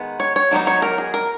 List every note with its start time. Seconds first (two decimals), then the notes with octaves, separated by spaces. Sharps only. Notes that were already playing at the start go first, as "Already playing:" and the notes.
Already playing: D#3 G#3 B3
0.20 C#5
0.36 C#5
0.51 D#3 F#3 B3 D#4
0.67 C#5
0.82 A#4
0.98 G#4
1.14 A#4